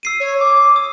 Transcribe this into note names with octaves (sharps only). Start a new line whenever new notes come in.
E6 C7 D#7
C#5
D6
D#6